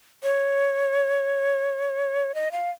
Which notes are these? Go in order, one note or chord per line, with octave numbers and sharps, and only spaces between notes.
C#5
D#5
F5